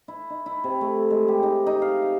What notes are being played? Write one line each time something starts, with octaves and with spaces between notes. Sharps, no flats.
E4
D#4
E4
C3
A3
G#3
G4
D#4
D#4
F5
E5